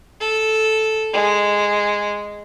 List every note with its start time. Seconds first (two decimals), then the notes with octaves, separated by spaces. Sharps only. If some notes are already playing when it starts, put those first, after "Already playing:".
0.21 A4
1.13 G#3